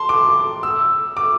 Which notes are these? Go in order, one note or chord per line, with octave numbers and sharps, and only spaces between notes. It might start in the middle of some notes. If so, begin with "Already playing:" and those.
Already playing: A5 C6
D6
E6
D6